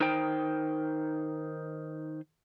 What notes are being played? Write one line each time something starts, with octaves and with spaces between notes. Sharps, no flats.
D#3 D#4 C5 G5